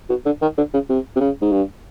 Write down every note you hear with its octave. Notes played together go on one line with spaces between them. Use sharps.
B2
D3
D#3
D3
C#3
C3
C3
C#3
G#2
G2